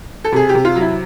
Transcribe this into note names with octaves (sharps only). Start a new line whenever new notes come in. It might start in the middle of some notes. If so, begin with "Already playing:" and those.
A4
C3 G#4
G4
C3
F4
F#3
E4